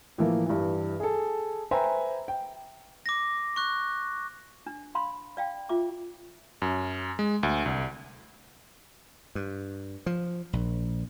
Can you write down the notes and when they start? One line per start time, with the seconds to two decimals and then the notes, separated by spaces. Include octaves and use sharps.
0.18 A2 E3 F3 A#3
0.46 G2 E3
1.00 G#4 A4
1.71 B4 C5 E5 G5 G#5 A#5
2.28 G5
3.06 D6 A#6
3.56 C#6 F#6
4.66 D4
4.95 F5 B5 C6
5.37 D5 F5 G5
5.69 F4 E5 D6
6.62 F#2
7.19 G#3
7.43 D2
7.66 C2
9.35 G2
10.06 F3
10.53 A#1